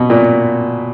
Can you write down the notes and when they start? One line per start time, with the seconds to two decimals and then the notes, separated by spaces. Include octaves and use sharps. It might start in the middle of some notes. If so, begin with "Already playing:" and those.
Already playing: B2
0.10 A#2